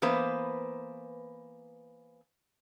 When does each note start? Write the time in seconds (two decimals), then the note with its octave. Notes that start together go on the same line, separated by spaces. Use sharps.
0.02 E3 A#3 B3 B4 C5